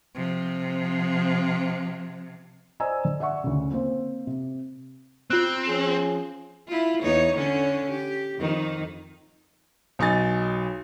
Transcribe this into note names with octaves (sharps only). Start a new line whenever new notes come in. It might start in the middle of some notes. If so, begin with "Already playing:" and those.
C3 F3
C5 D5 D#5 G#5 A#5 E6
D3
D5 E5 F#5 C#6
D2 C#3
A#3 C4 C5
C3
C4 F4 F#6
F3 C#4 G#4
E4 F4
E2 D#4 C#5
D3 C#4 D4
G4
F2 D#3 D#4
B1 D#4 G#5 A6